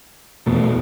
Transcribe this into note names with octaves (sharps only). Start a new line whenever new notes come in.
E2 B2 A3